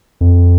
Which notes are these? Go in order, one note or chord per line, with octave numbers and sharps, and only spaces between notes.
F2